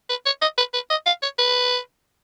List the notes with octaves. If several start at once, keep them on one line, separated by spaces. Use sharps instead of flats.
B4
C#5
D#5
B4
B4
D#5
F5
C#5
B4